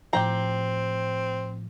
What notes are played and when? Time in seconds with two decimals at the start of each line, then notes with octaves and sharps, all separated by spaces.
0.13 A2 F3 C4 G4 G5 A#5